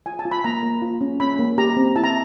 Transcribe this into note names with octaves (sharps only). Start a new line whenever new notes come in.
F4 G#5
A5
F4
B5
A#3 A#5
A#3
F4
C#4
C#4 B5
A#3
G4 A#5
C4
E4 A5
A#5